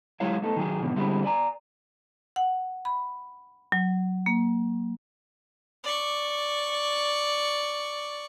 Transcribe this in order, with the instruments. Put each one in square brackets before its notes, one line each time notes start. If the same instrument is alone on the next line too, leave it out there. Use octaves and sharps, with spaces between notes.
[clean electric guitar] F#3 G#3 E4 G4 C#5 F5
A3 B3 D#4 A4
D#3 F#3 G#4
F2 G#2 B2 D3 D#3
D3 G3 G#3 C4 E4
D5 G#5 A#5
[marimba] F#5
B5
F#3
A#3
[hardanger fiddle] D5 C#6